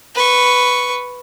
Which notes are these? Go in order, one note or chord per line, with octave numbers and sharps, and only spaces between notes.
B4 C#6